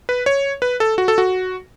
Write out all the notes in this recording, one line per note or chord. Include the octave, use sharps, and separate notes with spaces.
B4
C#5
B4
A4
F#4
A4
F#4